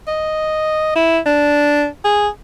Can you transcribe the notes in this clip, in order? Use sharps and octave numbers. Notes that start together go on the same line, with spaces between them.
D#5
E4
D4
G#4